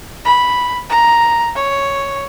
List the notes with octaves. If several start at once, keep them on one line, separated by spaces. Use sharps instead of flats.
B5
A#5
C#5